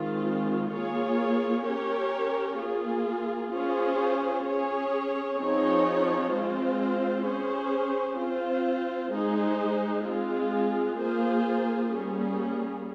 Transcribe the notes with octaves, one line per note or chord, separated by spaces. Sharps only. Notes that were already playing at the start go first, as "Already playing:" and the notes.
Already playing: D#3 G#3 C4 F4
A#3 F4 G#4 C#5
C#4 G4 A#4 C#5
A#3 F4 G#4
C#4 F4 G#4 C5
C#4 G#4 C#5
F3 C4 D#4 G#4 C#5
G#3 C4 F4 C5
C#4 G#4 C5
C4 F4 C5
G#3 D#4 G#4 C5
G#3 C4 F4 G#4
A#3 F4 G#4 C5
G3 A#3 C#4 G#4